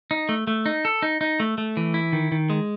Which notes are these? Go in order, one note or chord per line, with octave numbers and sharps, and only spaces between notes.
D#4
A3
A3
D#4
A4
D#4
D#4
A3
A3
E3
E4
D#3
D#3
G#3